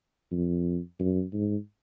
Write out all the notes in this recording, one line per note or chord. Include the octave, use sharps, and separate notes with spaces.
F2
F#2
G#2